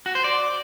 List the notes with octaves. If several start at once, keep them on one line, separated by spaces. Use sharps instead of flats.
F#4
C5
D5